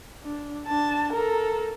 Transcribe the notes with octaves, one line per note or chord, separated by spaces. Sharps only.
D4
D4 A5
A4 A#4